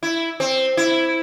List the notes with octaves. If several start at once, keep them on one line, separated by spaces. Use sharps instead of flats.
E4
C4
E4